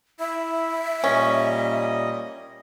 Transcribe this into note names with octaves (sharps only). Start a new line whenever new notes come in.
E4 E5
A#2 G3 C#4 D#5